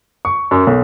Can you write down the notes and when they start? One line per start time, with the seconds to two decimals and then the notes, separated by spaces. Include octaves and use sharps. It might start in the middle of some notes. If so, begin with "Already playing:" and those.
0.25 C#6
0.51 F#2
0.67 B1